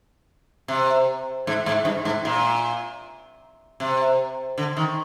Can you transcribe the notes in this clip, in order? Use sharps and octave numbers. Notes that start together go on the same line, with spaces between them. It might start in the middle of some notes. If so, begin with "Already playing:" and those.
C3
G#2
G#2
G2
G#2
A#2
C3
D3
D#3